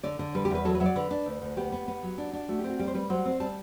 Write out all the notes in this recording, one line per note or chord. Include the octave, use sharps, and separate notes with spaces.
D3 D5
D3
G3 B4
G4
E2 B4
F#3 A4
B4
F#3 E5
D5
D3 B4
D4
D2
D2
B3 G4
B3
B3
F#3
D4
D4
A3 F#4
C4 G4
F#4
G3 G4
C5
G3 B4
F#3 C5
C4
G3 A5